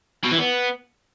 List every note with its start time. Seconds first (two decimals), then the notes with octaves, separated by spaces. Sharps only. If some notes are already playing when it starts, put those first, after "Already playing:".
0.25 B2
0.32 E3
0.39 B3